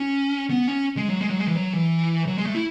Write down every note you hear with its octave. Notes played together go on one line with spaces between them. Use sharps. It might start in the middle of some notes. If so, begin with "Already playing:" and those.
Already playing: C#4
B3
C#4
G#3
F#3
G#3
F#3
G#3
E3
F#3
E3
F#3
G#3
A3
E4